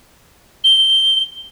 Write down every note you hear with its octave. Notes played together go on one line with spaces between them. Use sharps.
G7